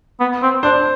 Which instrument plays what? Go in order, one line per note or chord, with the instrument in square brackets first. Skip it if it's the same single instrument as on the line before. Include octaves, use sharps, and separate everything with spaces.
[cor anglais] B3
C4
[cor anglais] D4 [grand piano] C5